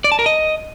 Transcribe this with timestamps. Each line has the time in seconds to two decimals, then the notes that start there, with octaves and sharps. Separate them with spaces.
0.04 D5
0.12 A5
0.19 A#4
0.26 D#5